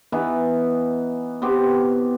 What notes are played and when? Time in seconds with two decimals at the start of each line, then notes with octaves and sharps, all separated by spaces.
0.12 E3 B3 D#4
1.42 B3 C4 G4